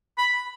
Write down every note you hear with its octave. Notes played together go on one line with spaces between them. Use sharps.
B5